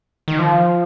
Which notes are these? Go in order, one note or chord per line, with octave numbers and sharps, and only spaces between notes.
D#3
F3